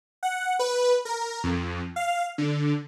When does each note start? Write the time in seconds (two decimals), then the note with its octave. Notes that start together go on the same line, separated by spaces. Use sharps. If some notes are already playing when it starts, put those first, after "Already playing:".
0.23 F#5
0.59 B4
1.05 A#4
1.44 F2
1.96 F5
2.38 D3